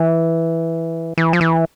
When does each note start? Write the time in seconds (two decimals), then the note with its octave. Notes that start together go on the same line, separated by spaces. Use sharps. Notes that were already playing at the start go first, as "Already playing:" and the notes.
Already playing: E3
1.18 E3
1.33 F3
1.41 E3